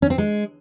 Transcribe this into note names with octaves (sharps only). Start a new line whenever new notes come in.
C#4
C4
G#3